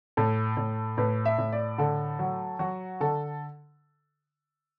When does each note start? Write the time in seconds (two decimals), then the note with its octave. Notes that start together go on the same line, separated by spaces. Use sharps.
0.17 A2 A4
0.57 A2
0.98 A2 B4
1.25 E5
1.38 A2
1.52 D5
1.78 D3 A4
2.19 F#3
2.59 F#3 F#4
3.00 D3 A4